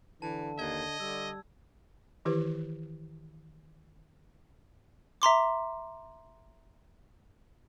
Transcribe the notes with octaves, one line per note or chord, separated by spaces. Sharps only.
D3 E3 A5
D#2 D#5 G#6
D3 G3 E6
D#3 E3 E4 G4 B4
E5 A#5 C6 D6